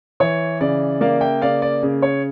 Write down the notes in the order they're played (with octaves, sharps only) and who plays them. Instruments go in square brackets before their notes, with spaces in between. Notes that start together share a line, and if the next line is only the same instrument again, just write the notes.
[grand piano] E3 C#5
C#3 D5
A#3 D5 F5
E5 G5
C#3 D5 F5
D5
C#3
C#5